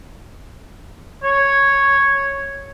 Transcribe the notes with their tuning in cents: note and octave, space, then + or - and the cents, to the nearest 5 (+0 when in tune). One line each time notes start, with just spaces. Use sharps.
C#5 -5